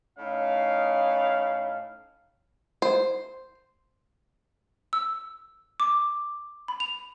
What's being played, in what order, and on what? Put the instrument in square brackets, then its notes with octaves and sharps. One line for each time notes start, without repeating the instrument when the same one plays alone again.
[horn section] A2 C#4 D#4 F5
[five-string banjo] C5
[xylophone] E6
D6
B5
F7